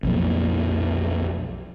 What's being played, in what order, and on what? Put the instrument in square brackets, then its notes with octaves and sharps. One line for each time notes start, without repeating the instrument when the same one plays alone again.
[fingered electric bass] B1 F2 A#2